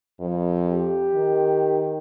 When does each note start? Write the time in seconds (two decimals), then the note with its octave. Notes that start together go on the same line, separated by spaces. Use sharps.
0.20 F2
0.70 G4
1.14 D#3